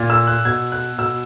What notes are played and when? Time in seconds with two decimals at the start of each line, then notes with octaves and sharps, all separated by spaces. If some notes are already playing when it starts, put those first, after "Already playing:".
Already playing: A#2
0.10 E6
0.27 F#6
0.45 B2 G#6
0.72 F#6
0.98 B2 E6